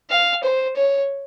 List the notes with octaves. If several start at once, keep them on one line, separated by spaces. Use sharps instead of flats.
F5
C5
C#5